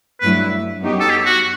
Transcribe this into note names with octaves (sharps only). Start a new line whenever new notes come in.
G2 F#3 A3 E4 B4
F#2 F#3 B3 D#4 G4
A4
G4
F#4